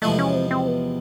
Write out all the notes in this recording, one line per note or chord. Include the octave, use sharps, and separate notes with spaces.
E2 C3 F3 G#3 A3
C#4
C4
C4
B3